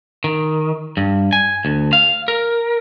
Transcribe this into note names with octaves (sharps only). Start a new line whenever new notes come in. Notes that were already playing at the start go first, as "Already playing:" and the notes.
D#3
G2
G#5
D2
F5
A#4